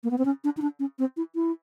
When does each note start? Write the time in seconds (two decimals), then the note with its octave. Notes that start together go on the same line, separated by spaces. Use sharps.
0.04 A#3
0.11 B3
0.18 C4
0.25 C#4
0.44 D4
0.57 D#4
0.62 D4
0.80 C#4
0.99 C4
1.17 E4
1.35 E4